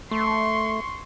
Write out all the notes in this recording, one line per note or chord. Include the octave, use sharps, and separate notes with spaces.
A3 C6 C#6